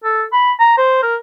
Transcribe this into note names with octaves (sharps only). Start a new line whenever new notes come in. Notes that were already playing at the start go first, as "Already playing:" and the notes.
A4
B5
A#5
C5
A#4